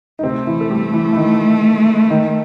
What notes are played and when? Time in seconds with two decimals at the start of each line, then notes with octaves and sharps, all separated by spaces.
0.19 D#4
0.23 C3 A3 C4
0.47 E3 E4
0.61 A4
0.70 G3 G4
0.93 E3 E4
1.12 E4
1.17 D#3 D#4
2.10 D#3 D#4